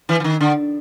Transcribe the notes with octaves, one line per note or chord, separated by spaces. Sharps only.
E3
E3
D#3
D3